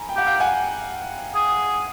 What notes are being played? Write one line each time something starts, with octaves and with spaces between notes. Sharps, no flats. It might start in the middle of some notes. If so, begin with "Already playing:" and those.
Already playing: G#5 A#5 B5
G5
G4 F#5
F5 G5
F#5 G#5
G#4